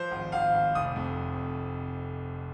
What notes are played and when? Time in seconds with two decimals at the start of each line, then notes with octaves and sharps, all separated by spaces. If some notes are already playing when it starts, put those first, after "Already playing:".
Already playing: F3 C5
0.11 G#1
0.32 G#1 F5
0.54 G#1
0.75 F1 D#6
0.96 F2